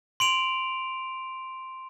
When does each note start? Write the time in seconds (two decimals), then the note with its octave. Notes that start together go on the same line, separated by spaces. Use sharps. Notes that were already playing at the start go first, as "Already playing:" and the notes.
0.20 C6 D7 F7